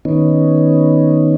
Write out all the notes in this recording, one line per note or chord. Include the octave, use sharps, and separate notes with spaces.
D#3 B3 C#4 D#4